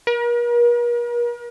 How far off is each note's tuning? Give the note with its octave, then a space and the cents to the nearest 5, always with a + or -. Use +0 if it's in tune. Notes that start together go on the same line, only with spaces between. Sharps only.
A#4 +45